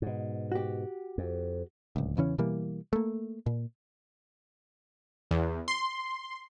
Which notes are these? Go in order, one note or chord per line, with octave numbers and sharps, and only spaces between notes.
G#2 B2
F#4 G4
F2
D1 C#2
E2 C#3 E3 C#4
B2 E3 G3 A#3
A3 A#3
A#2
E2
C6